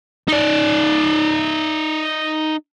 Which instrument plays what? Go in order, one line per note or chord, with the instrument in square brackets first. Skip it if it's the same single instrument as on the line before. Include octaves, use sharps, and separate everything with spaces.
[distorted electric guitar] D#4 D5